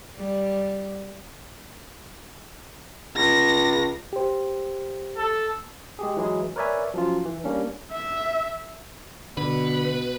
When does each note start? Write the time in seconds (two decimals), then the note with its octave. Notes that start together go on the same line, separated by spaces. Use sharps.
0.17 G3
3.16 C#2 A#6
4.13 G4 C5
5.17 A4
5.99 G#3 G4 G#4
6.17 E3 F#3 G#3 E4 G#4
6.56 A#4 B4 C#5 D5 E5 G#5
6.94 F3 F#3 C#4 F4
7.25 E3
7.44 G3 A#3 C#4 D4
7.92 E5
9.37 B2 D3 B4